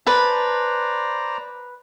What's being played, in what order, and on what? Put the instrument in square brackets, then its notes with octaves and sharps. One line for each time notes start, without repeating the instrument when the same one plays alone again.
[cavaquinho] B4 A5 [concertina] C5 D5 A#5